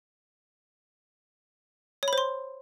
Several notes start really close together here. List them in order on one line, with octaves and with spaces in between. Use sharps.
C#5 B5 C5 C6